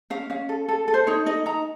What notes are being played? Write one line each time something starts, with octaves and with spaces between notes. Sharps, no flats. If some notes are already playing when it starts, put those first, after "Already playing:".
C#4 F5
C#4 F5
A4
A4
A4
C5
D#4 C#5
D#4 D#5
D#4 A#5